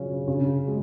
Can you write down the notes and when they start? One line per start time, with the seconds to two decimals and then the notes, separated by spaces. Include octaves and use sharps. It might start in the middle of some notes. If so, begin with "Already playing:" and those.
Already playing: C#3 F#3 C#4 F4
0.28 C#3
0.68 G#3